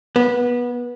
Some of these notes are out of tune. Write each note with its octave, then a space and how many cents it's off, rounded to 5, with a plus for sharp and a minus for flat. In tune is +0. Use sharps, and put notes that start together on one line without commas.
B3 -20